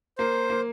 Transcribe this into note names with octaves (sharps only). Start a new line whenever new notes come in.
A#3 C5
A#3